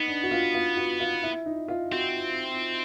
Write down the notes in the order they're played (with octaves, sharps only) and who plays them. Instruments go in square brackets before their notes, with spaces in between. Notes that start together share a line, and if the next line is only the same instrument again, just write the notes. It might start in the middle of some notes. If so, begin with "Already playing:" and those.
Already playing: [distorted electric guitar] B3 [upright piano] D#4
[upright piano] D4
F#4
F4
F4
F#4
F4
E4
D#4
F4
[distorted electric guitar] C4 [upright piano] F#4